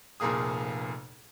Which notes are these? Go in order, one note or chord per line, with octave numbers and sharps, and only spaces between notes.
F1 F2 A#2 A#3 G#4 D#6